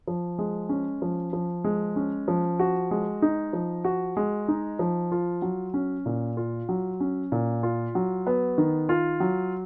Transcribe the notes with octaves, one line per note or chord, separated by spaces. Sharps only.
F3
G#3
C#4
F3
F3
G#3
C#4
F3
F#4
G#3
D#4
F3
F#4
G#3
D#4
F3
F4
F#3
C#4
A#2
F4
F#3
C#4
A#2
F4
F#3
B3
D#3
F4
F#3